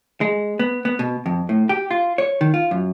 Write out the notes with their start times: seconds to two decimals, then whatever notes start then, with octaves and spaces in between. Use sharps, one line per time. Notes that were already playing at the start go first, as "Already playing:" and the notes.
0.21 G#3
0.59 B3
0.85 B3
0.99 B2
1.26 F2
1.49 A2
1.69 G4
1.91 F4
2.18 C#5
2.41 D#3
2.54 F4
2.71 F#2